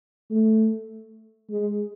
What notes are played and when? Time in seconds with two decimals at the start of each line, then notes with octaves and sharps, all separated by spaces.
0.31 A3
1.50 G#3